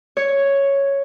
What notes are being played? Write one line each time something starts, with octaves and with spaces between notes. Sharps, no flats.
C#5